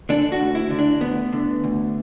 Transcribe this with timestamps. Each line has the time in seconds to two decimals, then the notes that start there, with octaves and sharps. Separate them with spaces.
0.09 D3 D4
0.32 F#4
0.40 D2
0.55 E4
0.71 D3
0.79 D4
1.01 D2 B3
1.32 D3
1.64 D2